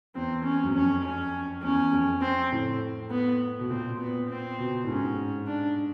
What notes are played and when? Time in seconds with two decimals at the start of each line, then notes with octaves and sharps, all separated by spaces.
0.15 E2 C4
0.45 C#4
0.63 F#2
0.75 F2 C#4
1.04 C#4
1.63 E2 C#4
1.93 F2
2.22 C4
2.52 A2
3.10 B3
3.59 B2
3.70 A#2 C4
3.99 B3
4.29 C4
4.59 B2
4.84 A2
4.88 G#2 C#4
5.47 D4